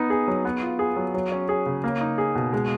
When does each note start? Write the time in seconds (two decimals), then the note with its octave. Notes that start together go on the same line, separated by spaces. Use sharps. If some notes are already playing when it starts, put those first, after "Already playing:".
Already playing: B3 D#4
0.10 G#4
0.28 F#3
0.45 B3
0.62 F4
0.79 G#4
0.96 F#3
1.14 F#3
1.32 C#4
1.49 G#4
1.66 C#3
1.84 A#3
2.01 D#4
2.18 G#4
2.35 B2
2.53 G#3